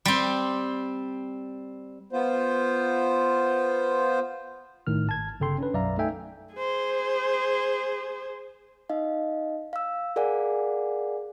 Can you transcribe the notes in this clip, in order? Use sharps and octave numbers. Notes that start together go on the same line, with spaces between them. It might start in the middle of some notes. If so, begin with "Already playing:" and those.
G3 C4
B3 F4 C5
A#1 A2 D#3 F6
G#1 A5 G#6
G1 C#3 A4 G5 C6
C#4 D4 B4
B1 F#2 D5 E5 F5 A#5
A3 D#4 A4 E5 G5 G#5
G#4 C5
D#4 D#5 F5
F5 E6
G#4 A#4 D5 F5 F#5 G#5